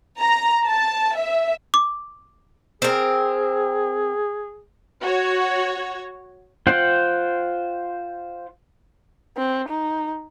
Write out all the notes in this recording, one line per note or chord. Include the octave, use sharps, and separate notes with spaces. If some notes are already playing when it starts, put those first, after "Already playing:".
A#5
A5
E5
D6
C4 G#4 A#4
F#4 C#5
F4 C5 F#5 G5
C4
D#4